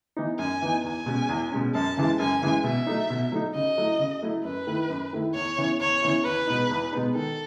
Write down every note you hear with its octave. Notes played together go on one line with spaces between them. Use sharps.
E3 B3 D#4
F#2 G#5
E3 B3 D#4
E2 G#5
B2 G#3 C#4
E2
B2 G#3 C#4
F#2 A5
C#3 E3 G#3
F#2 G#5
C#3 E3 G#3
B2 E5
F#3 A3 D#4
B2
F#3 A3 D#4
C#3 D#5
F#3 A3 E4
C#3
F#3 A3 E4
F#2 B4
D#3 A3 E4
F#2
D#3 A3 E4
E2 C#5
C#3 E3 B3 E4
E2 C#5
C#3 E3 B3 E4
E2 B4
B2 G#3 B3 D#4
E2
B2 G#3 B3 D#4
D#3 A4